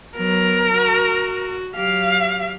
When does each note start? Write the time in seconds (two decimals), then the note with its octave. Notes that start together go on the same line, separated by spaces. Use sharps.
0.17 F#3 B3 A#4
0.75 F#4
1.76 F#3 G4 F5